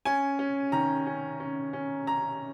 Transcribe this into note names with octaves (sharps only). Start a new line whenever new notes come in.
C#4 G#5
C#4
D#3 A#5
C#4
C#4
C#4
C#4 A#5